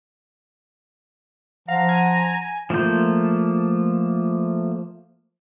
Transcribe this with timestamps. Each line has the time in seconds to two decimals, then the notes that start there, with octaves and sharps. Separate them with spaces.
1.68 F3 F5 F#5 A#5
1.89 G#5
2.70 F3 A3 A#3 F4 G6